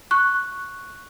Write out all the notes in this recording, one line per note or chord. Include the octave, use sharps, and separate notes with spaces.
C#6 F#6